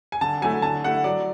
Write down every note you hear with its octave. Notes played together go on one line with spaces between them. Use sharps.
G#5
D3 A5
F#3 A3 E4 G#5
D3 A5
A3 E4 F#5
F#3 D5